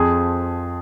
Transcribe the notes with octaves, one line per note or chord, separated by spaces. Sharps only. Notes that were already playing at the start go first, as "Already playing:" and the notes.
Already playing: F2 F3 G#4